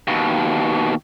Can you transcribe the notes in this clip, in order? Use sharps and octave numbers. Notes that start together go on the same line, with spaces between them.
D#2 B2